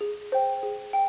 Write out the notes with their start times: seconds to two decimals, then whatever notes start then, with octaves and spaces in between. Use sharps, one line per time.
0.01 G#4
0.32 C5 G5
0.63 G#4
0.93 G5